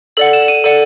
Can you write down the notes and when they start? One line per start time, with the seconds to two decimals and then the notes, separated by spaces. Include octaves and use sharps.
0.17 A4 D5 F#5 F#7
0.33 E7
0.48 D#7
0.64 A4 D5 F#5 D#7